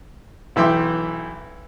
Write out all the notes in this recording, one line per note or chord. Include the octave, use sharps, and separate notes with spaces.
B1 E3 E5 G5 C6 D6